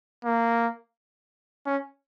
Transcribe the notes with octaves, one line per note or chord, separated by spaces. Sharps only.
A#3
C#4